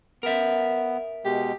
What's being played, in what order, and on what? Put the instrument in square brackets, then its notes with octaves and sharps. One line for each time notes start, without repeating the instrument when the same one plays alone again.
[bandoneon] B3 [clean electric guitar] A#4 E5
[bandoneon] B2 G#3 [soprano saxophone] G4